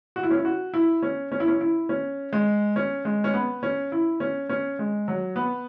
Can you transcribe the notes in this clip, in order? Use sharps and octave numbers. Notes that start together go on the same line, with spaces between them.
F#4
E4
C#4
E4
F#4
E4
C#4
C#4
E4
C#4
E4
C#4
G#3
C#4
G#3
C#4
B3
C#4
E4
C#4
C#4
G#3
F#3
B3